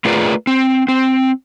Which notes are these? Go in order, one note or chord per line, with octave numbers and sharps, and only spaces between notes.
A3 F4 G#4 A#4 B4 D5
C4
C4